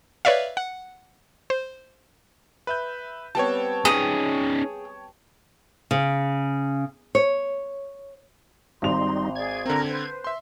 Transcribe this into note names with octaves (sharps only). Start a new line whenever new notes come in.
B4 C#5 D5 E5 F5
F#5
C5
B4 E5 G6
G3 B3 C4 C#5 G5 A5
C#4 D#4 G#4
C#3
C#5
G#1 G3 D#4 C6 F7
G#4 D5 G#6
D3 C4 A#4 A#5
B4 C5
E5 C6